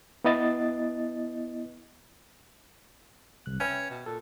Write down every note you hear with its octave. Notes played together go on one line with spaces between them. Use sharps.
B3 E4 D#5 A6
C2 F#6
C#4 B4 E5 G5
B2
A#2 A4